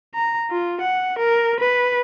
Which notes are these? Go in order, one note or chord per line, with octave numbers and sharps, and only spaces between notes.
A#5
F4
F#5
A#4
B4